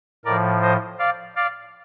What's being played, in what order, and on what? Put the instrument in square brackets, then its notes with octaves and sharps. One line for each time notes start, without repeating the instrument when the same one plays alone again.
[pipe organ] A2 F3 A#4 D5
C5 D#5
D5 F5
D5 F5